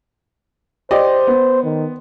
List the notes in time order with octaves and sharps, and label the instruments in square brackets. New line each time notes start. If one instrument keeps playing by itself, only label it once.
[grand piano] G4 D5 D#5 [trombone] C5
[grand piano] B3
[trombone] D#3